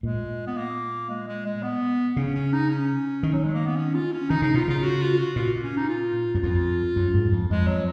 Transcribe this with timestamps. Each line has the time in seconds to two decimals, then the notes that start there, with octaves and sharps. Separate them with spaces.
0.03 A#2 G#3
0.47 B3
0.57 A#3
1.09 G#3
1.28 G#3
1.45 G#3
1.63 B3
2.16 C#3 C#4
2.35 C#4
2.53 D#4
2.69 C#4
3.23 D#3
3.33 F#3
3.44 G#3
3.55 A#3
3.66 B3
3.76 C#4
3.94 F4
4.12 C#4
4.29 D#3 D#4
4.42 C#3 D#4
4.54 B2 F4
4.68 C#3 F4
4.83 F#4
5.01 F4
5.19 F#4
5.36 A#2 F4
5.63 C#4
5.77 D#4
5.89 F4
6.35 F#2
6.43 F2 F4
6.96 F#2
7.14 G#2
7.32 F2
7.50 F2 G#3
7.68 F#3